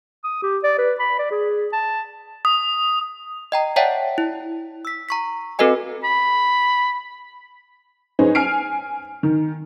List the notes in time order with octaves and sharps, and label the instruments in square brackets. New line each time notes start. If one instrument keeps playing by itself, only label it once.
[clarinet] D#6
G4
D5
B4
B5
D5
G#4
A5
[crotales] D#6
[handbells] D#5 G5 A#5
C#5 D5 E5 F#5 G5 A5
E4
E6 B6
A#5 C#6 B6
C4 F#4 A4 B4 D#5 G#5
[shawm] B5
[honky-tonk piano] C#4 D#4 G#4 B4 C5
G#5 F6 C7 D7
D#3